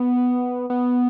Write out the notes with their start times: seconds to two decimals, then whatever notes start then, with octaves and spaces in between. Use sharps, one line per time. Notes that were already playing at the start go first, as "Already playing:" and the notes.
Already playing: B3
0.70 B3